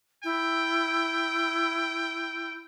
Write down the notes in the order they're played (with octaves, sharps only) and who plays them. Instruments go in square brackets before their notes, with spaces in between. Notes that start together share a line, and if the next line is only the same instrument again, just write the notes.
[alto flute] E4 [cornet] G5